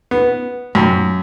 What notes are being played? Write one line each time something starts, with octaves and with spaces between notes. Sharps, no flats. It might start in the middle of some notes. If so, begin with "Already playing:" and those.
B3
F#2